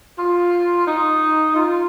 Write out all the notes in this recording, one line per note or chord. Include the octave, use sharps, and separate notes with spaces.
F4
D#4
F4